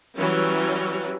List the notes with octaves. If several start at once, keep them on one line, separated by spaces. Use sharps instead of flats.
E3 F#3 G3 C#4